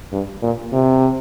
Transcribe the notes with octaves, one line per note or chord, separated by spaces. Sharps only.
G2
A#2
C3